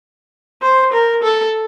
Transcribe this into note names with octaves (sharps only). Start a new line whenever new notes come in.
C5
A#4
A4